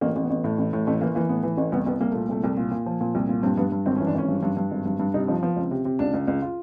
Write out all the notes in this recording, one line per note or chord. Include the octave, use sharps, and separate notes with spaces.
A1 A#3
A1
B3
A1
A2
A1
A2
A1 A3
E3 A#3
E3 A#3
A2 B3
E3
A1
C2 B3
C2 B3
C2 A#3
A#2 A3
C2 A3
C2
A#2
A#2
F3
A#2
C2
A#2
G2 C4
G2 B3
G2
G#1 C4
C#4
E3
D4
G#1 C#4
G2
G2
G2
G#1
G2
G2
C3 D#4
F3 D#4
F3 B3
C#2 C4
C3
C3
C#2 D4
C#2
C#2
F4